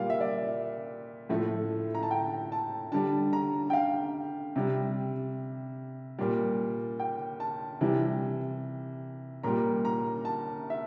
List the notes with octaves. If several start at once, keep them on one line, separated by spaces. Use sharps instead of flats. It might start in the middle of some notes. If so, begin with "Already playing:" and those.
Already playing: A#2 G3 F5
E5
D5
A2 F3 A3
A#5
A5
G5
A5
D3 G3 A5
A#5
G5
F5
C3 G3
A#2 G3
G5
A5
C3 E3 G3
A#2 G3 A#5
A#5
A5
E5